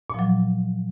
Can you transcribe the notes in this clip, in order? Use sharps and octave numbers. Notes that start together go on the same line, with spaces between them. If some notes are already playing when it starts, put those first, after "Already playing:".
A#2 F3 F#3